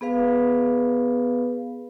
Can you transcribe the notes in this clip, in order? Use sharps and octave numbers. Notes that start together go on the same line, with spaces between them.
B3 G#4 B4 F5